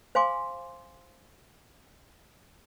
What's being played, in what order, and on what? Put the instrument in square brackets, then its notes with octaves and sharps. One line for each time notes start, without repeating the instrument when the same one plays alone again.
[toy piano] C5 F5 G#5 C6 D6